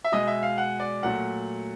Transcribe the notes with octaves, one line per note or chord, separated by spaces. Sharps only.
E5
B2 G#3 D#5
E5
F5
F#5
D5
A#2 F#3 A3 F#5